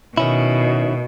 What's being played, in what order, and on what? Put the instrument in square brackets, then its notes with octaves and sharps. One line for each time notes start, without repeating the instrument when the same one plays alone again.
[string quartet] B2 [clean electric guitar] D#3 C#4 E4